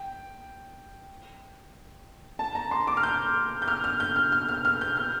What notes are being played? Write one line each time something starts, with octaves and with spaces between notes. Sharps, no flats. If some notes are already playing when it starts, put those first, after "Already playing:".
Already playing: G5
A5
A#5
C6
D6
F6
G6
G6
F6
F6
G6
F6
F6
F6
F6
G6
F6